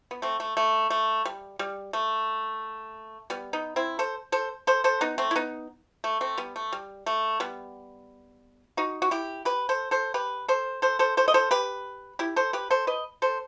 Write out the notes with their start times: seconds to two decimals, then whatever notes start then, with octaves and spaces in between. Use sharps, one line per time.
0.11 B3
0.22 A3 C4
0.40 A3
0.57 A3
0.90 A3
1.25 G3
1.59 G3
1.93 A3
3.30 G3 B3
3.53 B3 D#4
3.76 C4 E4
3.99 A4 C5
4.32 A4 C5
4.67 A4 C5
4.84 A4 C5
5.01 B3 D#4
5.18 A3 C4
5.31 E4
5.36 B3 D#4
6.04 A3
6.21 A3 C4
6.37 G3 B3
6.56 A3
6.72 G3
7.06 A3
7.40 G3 B3
8.77 D#4 F#4
9.02 F#4
9.11 E4 G4
9.45 G4 B4
9.69 A4 C5
9.91 A4 C5
10.14 G4 B4
10.48 A4 C5
10.82 A4 C5
10.99 A4 C5
11.17 A4 C5
11.28 D#5
11.34 A4 C5
11.51 G4 B4
12.19 E4 G4
12.36 A4 C5
12.53 G4 B4
12.70 A4 C5
12.87 B4 D#5
13.22 A4 C5